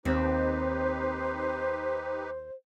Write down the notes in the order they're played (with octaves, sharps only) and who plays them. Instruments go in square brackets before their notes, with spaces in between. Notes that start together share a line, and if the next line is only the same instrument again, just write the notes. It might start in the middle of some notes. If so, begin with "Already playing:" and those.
[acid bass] D#2 [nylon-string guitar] C4 [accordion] D#4 G4 B4 [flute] C5